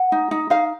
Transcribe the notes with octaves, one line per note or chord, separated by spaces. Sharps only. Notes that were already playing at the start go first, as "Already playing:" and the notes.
Already playing: F#5
D#4
D#4
D#4 F5